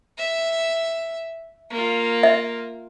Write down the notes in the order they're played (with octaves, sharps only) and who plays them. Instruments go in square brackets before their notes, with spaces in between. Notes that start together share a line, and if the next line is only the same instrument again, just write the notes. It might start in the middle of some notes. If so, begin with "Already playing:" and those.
[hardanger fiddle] E5
A#3 F4
[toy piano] E5